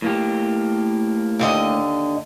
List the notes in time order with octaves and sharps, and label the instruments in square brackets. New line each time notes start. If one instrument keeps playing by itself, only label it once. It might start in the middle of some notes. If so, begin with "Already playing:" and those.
[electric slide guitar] A2 A#3 G4
[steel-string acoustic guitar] D#2 D3 D#5